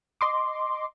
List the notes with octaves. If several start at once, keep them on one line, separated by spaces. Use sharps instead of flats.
D#5 C6 D6